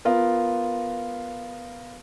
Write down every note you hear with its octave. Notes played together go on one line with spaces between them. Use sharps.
B3 F4 A#4